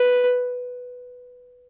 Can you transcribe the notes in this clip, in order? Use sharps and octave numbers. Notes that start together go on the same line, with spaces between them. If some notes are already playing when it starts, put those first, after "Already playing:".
Already playing: B4